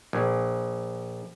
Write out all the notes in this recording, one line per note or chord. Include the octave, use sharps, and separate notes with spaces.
A#1